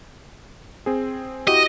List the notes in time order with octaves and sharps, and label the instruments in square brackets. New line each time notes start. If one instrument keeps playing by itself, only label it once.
[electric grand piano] C4 G#4
[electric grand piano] E4 F#4 G4 [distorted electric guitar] D#5